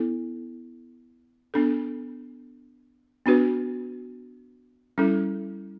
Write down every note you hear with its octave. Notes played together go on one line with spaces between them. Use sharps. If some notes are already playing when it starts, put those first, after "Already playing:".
Already playing: B3 E4 A4
B3 D4 A4
B3 D4 F#4 B4
G3 C#4 E4 A4